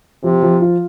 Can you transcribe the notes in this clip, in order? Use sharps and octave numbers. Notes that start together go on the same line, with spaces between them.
C3 F3
F3
F4